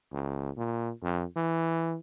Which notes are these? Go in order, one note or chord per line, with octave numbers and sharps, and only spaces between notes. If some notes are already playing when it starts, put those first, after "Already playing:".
C#2
A#2
F2
E3